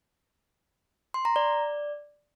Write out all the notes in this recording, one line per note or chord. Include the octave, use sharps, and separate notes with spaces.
C6
A#5
D5